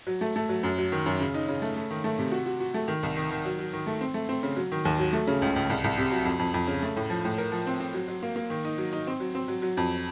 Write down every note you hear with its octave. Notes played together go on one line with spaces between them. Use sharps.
F#3
A3
A3
F#3
F#2
F#3
D#3
F#2
C#3
D#4
C#3
A3
A3
D#3
A3
C3
F#4
F#4
F#4
A3
D#3
C2
D#3
D#3
F#3
F#3
D#3
A3
C4
A3
C4
C#3
F#3
D#3
D#2
F#3
A3
C#3
C#2
C#2
C2
C2
C3
F#3
F2
F2
F2
C#3
A3
A2
F3
A2
A#4
F3
C4
C4
F#3
F#3
A#3
A#3
D#3
D#4
F#3
D#4
C4
F#3
C4
F#3
F#3
F2